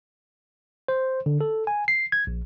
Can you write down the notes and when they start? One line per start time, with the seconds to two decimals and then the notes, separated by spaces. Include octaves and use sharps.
0.88 C5
1.26 D3
1.41 A4
1.67 G#5
1.88 C7
2.12 G#6
2.27 A#1